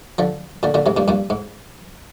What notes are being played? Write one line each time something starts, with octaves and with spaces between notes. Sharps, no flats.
D3 F3
A#2 D3
A#2 D3
G#2 C3
G2 A#2
G2 A#2
G#2